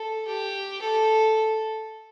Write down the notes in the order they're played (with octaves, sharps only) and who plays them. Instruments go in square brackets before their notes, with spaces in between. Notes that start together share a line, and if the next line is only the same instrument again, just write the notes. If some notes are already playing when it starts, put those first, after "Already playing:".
Already playing: [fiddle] A4
G4
A4